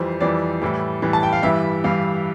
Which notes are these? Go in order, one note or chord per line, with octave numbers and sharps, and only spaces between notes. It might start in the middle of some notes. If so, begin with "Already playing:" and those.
Already playing: F2 E3 G3 C5
F2 E3 G3 D5
A2 E3 G3
A2 E3 G3
A5
G5
F5
G2 E3 G3 E5
G2 E3 G3 F5